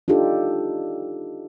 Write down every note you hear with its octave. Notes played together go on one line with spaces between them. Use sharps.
D4 D#4 F4 G4 A4